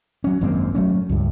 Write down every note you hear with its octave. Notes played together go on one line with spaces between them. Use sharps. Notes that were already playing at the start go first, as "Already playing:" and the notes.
F#3 C#4
G#1 F#2 A#3 C4
F#3 A3 C#4
C#2 G2